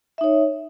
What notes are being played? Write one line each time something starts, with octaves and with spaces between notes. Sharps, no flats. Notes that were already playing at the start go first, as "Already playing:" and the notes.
D#4 C#5 E5